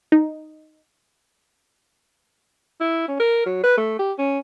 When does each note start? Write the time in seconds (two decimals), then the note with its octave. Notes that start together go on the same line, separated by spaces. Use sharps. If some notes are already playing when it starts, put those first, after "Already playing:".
0.12 D#4
2.80 E4
3.08 C#4
3.19 A#4
3.46 F#3
3.64 B4
3.77 A3
3.99 G4
4.18 C#4